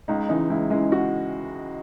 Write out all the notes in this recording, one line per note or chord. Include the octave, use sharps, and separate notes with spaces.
C#2 D#4
C#3 E3 G#3 D#4
C#2 E4
C#3 E3 G#3
F#4